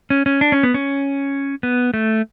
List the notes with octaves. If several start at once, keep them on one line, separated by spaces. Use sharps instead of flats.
C#4
C#4
D4
C#4
B3
C#4
B3
A3